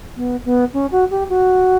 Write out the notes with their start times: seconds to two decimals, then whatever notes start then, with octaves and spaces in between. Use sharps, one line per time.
0.17 B3
0.45 B3
0.74 C#4
0.92 F#4
1.11 G4
1.29 F#4